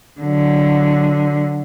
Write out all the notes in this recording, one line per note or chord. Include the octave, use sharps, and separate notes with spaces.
D3 F#3